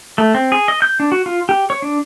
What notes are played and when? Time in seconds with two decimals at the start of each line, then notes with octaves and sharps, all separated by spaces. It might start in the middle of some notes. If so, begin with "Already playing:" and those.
0.18 A3
0.34 C4
0.52 G#4
0.68 D#5
0.82 G6
1.00 D4
1.12 F#4
1.26 F4
1.49 G4
1.70 C#5
1.82 D4